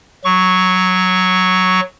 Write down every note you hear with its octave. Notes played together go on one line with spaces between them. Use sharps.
F#3 C#6